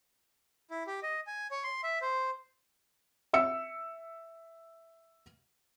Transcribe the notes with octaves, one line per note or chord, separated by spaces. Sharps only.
E4
G4
D#5
G#5
C#5
C6
E5
C5
E5 E6 C#7